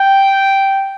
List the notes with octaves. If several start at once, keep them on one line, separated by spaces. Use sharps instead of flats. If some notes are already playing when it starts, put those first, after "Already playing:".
Already playing: G5